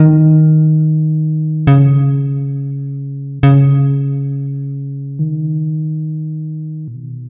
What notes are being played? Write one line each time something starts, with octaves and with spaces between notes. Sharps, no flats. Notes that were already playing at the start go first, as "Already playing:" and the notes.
Already playing: D#3
C#3
C#3
D#3
A#2
B2